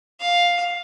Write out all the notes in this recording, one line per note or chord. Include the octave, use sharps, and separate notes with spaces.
F5